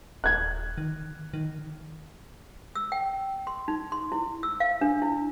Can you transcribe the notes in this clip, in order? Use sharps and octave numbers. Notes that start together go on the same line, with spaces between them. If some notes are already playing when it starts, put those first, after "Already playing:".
D#1 F#6 G#6
D#3
D#3
E6
G5
C6
D#4
C6
E4
E6
F5
D4
E4